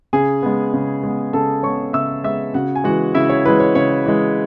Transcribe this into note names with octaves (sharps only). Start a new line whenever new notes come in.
C#3 G#4 G#5
G#3 B3
C#3
G#3 B3
C#3 A4 A5
G#3 B3 C#5 C#6
C#3 E5 E6
G#3 B3 E5 E6
C#3 F#4 F#5
G#5
E3 G#3 F#4 F#5
C#3 E4 E5
C#5
E3 G#3 B4
C#5
C#3 C#5
E3 G#3